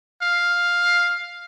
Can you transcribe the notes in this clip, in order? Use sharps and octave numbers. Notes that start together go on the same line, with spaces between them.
F5